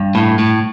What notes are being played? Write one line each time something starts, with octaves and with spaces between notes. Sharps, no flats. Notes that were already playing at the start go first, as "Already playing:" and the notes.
Already playing: G2
A2
A2